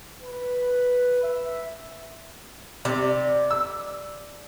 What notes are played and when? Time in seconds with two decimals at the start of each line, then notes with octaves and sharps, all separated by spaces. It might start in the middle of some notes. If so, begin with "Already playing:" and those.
0.22 B4
1.23 E5
2.85 C3 D5
3.51 E6